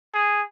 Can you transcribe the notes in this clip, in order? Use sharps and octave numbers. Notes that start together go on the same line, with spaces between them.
G#4